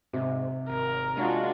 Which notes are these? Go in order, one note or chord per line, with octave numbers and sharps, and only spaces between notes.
G#2 C3
G#1 A#4
G#3 D4 F4 F#4